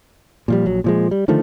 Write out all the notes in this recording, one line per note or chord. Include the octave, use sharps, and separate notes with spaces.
A#2 F3 G3
A#1 F#3
A#2 F3 G#3
G3
D3 D#3 F3 A3